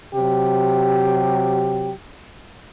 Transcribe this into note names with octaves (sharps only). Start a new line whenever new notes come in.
C3 F#3 G4